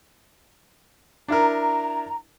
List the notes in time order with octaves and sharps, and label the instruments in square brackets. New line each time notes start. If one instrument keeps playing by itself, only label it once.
[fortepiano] D4 E4 A#4 [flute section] A#5